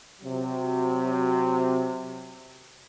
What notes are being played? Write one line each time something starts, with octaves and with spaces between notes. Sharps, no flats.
C3 F#3